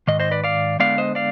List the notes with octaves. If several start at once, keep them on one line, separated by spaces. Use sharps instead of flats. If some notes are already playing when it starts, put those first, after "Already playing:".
G#2 D#3 D#5
C5 D#5
B4 D5
D5 F5
D3 G#3 B3 D5 F5
C5 D#5
D5 F5